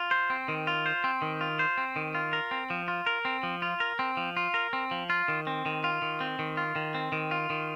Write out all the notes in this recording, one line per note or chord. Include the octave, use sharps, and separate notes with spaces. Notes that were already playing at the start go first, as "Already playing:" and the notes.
Already playing: F4
C5
C4
D#3
F4
C5
C4
D#3
F4
C5
C4
D#3
F4
A#4
C4
F3
F4
A#4
C4
F3
F4
A#4
C4
F3
F4
A#4
C4
F3
F4
D#3
C4
D#3
F4
D#3
C4
D#3
F4
D#3
C4
D#3
F4
D#3